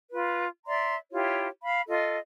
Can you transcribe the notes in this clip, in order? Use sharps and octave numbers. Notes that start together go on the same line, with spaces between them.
F4 B4
D5 E5 A#5 C6
E4 F4 G4 C#5
F5 B5
F4 A4 D#5